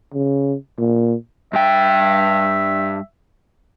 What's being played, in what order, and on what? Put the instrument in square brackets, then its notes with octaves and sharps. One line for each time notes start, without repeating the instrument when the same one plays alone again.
[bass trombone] C#3
A#2
[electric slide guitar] G2 G5 [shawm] E5